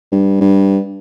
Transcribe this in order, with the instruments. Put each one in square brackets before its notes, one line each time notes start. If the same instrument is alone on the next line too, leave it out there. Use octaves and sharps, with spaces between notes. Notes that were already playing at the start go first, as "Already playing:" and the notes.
[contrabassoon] G2
G2